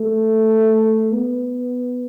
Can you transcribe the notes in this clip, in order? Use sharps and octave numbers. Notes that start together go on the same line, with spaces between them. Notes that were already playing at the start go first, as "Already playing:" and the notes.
Already playing: A3
B3